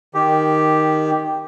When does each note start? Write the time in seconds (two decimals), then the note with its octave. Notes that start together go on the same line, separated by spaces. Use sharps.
0.14 D#3 G4